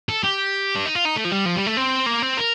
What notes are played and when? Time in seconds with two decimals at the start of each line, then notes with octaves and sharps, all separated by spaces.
0.09 A4
0.24 G4
0.75 D4
0.86 D#4
0.95 F4
1.05 D#4
1.16 A3
1.24 F3
1.31 G3
1.45 F3
1.56 G3
1.66 A3
1.77 C4
2.06 A#3
2.22 C4
2.38 A#4